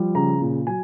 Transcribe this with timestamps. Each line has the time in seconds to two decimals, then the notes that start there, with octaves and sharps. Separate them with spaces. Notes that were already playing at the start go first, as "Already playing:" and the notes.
Already playing: F3 G3
0.15 C#3 A#5
0.41 A#2
0.67 F#3 G#5